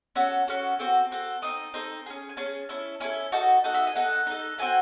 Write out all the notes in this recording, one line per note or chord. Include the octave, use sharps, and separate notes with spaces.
C#4 F#4 A4 E6
C#4 F#4 A4
C4 F#4 A4
C4 F#4 A4
C4 D#4 A4 D#6
C4 D#4 A4
C#4 G#4
G#5
C#4 G#4 A5
C#4 E4 A4
C#4 E4 A4 G#5
D#4 F#4 A4 A5
D#4 F#4 A4 F#5
E5
G#5
D#4 A4 F#5
D#4 A4
C4 F#4 A4 G#5